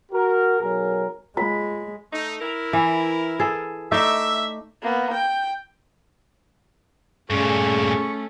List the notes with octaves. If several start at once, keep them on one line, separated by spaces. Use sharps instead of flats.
F#4 A#4
B1 F#3 G#4 A#4
G#3 F4 B5
A3 D#4
E4 A#4
E3
G#4 A4
A3 D#4 D5 E5
A#3 B3
G5
G2 A#2 A3 C#4 G#4 C#6